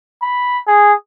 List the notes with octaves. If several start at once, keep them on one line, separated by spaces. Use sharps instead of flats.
B5
G#4